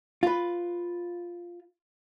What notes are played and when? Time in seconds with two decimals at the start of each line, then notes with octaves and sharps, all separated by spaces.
0.23 F4 B4